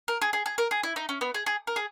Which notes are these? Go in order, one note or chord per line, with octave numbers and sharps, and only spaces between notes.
A#4
G#4
G#4
G#4
A#4
G#4
E4
D#4
C#4
B3
G#4
G#4
A#4
G#4